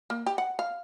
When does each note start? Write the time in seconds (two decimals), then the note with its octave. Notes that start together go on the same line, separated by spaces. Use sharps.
0.10 A#3
0.26 G4
0.38 F#5
0.59 F5